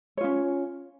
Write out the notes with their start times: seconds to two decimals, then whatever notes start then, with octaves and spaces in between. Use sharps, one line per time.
0.17 C#5
0.21 F4
0.24 C#4